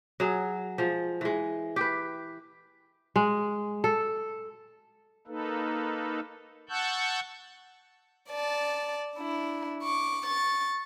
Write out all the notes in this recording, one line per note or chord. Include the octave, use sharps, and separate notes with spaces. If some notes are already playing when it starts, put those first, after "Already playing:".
F#3 G#4
F3 G#3
E3 G#3
G4 B4
G#3
A4
A#3 D#4 A4 B4
F#5 A5 C#6 E6 F#6 G6
D5 A5
D4 E4
C#6 D6
C#6 A6